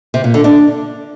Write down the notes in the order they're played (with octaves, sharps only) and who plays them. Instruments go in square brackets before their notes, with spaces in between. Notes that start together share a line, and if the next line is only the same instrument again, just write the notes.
[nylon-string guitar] C3
A#2
D3
D4